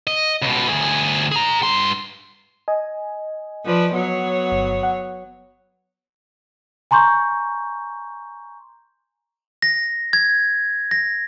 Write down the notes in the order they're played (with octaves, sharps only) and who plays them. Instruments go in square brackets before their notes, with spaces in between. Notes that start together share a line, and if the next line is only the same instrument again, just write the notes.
[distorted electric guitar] D#5
C#2 B2
D2 G#4
G#4 A#5
G2 C6
[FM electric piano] D#5 G#5
[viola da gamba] F3 B4 D5
F#3 B3 C#5
[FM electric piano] G1
F#5
[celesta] G#5 A#5 C6 C#6 G6
[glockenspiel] A#6
G#6
A#6